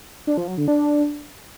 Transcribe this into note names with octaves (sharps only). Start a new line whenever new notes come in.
D4
F3
F#3
D3
D4